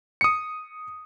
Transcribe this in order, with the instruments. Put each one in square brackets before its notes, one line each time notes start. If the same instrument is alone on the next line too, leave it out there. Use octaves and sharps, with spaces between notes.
[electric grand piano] D#6 C#7